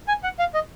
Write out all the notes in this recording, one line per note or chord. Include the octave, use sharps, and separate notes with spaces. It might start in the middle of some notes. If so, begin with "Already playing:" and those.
G#5
F#5
F5
D#5